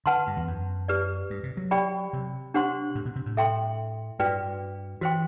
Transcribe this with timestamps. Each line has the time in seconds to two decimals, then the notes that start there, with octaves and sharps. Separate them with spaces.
0.06 D3 B4 F#5 A5 C6
0.27 G2
0.37 E2
0.47 F#2
0.88 G4 B4 D5
1.30 G2
1.43 C3
1.57 F#3
1.71 G4 D5 G5 B5
2.13 C3
2.54 D4 G4 C5 F#5 C6
2.95 A2
3.05 B2
3.16 C3
3.26 A2
3.37 A4 E5 G5 C6
4.19 G2 F#4 B4 D5 G5
5.01 E3 F#4 C5 G5 C6